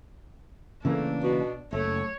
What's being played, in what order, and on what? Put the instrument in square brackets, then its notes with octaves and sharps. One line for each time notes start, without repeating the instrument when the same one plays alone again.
[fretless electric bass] C#3 E3 A#3 [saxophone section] A3 [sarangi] D4
[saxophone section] B2
[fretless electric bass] F#1 [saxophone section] A3 [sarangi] C#5